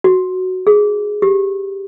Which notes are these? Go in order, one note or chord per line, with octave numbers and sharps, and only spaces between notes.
F#4
G#4
G4